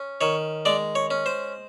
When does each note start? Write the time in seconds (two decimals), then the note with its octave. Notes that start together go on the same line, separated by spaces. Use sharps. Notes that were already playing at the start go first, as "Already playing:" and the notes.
Already playing: C#4
0.21 D#3 C#5
0.65 G#3 D5
0.95 C#5
1.11 C#4
1.26 C5